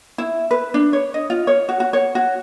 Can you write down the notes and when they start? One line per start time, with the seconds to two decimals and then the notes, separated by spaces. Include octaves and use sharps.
0.18 E4
0.51 B4
0.74 D4
0.93 C#5
1.14 D#5
1.30 F4
1.47 C#5
1.69 F#4
1.80 F#4
1.93 C#5
2.15 F#4